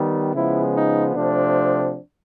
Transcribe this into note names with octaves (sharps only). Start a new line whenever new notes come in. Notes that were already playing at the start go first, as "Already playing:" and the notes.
Already playing: D#3 G3 B3
C#3 F3 G#3 B3 E4
D#4
C3 F3 A3 C4 D4